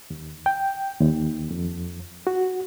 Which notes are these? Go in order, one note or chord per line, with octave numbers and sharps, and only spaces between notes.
D#2
G5
D#2
F2
F#4